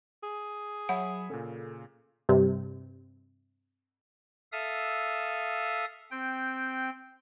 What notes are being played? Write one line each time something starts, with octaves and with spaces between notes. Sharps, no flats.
G#4
F#3 C#5 E5 F#5 B5
A#2 C#3 C#4 A4
G2 C3
A4 E5 F5 D#6
C4 G5